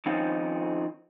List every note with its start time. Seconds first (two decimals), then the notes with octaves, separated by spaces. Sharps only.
0.06 D#3 F3 C4 C#4 D#4 F4